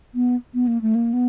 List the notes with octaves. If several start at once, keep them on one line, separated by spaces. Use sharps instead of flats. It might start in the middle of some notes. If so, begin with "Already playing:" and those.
B3
B3
A#3
A3
A#3
B3